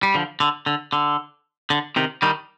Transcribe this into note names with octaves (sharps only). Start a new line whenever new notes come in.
G3
D3 F3
D3
D3
D3
D3
C3 D#3
D#3 G3